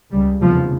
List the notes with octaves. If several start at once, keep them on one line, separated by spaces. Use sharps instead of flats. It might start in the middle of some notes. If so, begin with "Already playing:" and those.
C#2 C#3 G3
F1 E2 C#3 F3